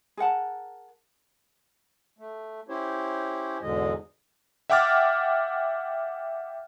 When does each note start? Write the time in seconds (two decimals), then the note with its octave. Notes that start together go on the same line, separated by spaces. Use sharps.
0.17 G#4 A#4 F#5 A5
2.19 A3
2.69 C#4 E4 G4 C5 C#5
3.62 E2 G#2 B2 D3 G#3 D#5
4.70 E5 F#5 G5 D6 F6 A6